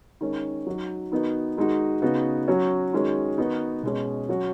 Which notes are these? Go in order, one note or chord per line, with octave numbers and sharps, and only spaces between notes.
D#3 G#3 C#4
F#3 D#4 F#4
D#3 B3 D#4 F#4
D#3 G#3 D#4 F#4
C#3 B3 D#4 F#4
F#3 C#4 F#4
D#3 G#3 C#4 F#4
D#3 B3 D#4 F#4
B2 G#3 C#4
F#3 C#4 F#4